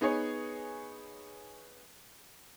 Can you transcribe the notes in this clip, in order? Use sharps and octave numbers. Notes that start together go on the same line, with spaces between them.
B3 D#4 G#4 B4 C#5